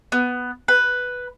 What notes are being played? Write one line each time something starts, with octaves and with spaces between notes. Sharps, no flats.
B3
B4